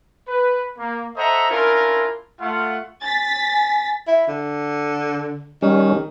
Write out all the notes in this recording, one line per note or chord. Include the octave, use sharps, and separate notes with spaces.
B4
A#3
A4 C5 D#5 E5 F#5 A#5
C#4 D4 E4 F4 A#4
A3 F4 F#5
G#5 A6 B6
E4
D3
D#3 G3 C#4